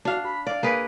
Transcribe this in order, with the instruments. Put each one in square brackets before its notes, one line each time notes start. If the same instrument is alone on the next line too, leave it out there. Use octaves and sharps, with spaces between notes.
[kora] D4 F5 [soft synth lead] F#4
[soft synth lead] B5
[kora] D5 [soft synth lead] F5
[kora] A#3 G#4 B4